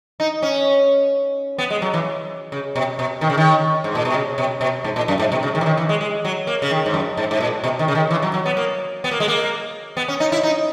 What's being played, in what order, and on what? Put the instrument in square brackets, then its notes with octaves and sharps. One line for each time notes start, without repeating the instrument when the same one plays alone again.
[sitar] D#4
C#4
B3
G#3
F#3
E3
C#3
B2
B2
D#3
C#3
D#3
G#2
A#2
B2
C#3
B2
B2
G#2
A#2
F#2
G#2
B2
C#3
D#3
E3
D#3
E3
G#3
G#3
F#3
A#3
C#3
D#3
G#2
F#2
G#2
G#2
A#2
B2
D#3
C#3
D#3
E3
F#3
F#3
B3
A#3
B3
A#3
G#3
A#3
B3
C#4
D#4
E4
D#4